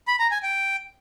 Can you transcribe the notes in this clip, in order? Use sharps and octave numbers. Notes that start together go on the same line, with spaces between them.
B5
A#5
G#5
G5